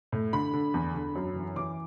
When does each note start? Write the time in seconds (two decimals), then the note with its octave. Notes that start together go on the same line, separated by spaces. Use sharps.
0.12 A2
0.33 D3 B5
0.54 D3
0.74 E2
0.94 D3
1.15 F#2
1.35 E3
1.56 E3 D6